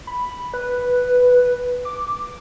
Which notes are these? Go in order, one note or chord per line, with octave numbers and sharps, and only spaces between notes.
B5
B4
D6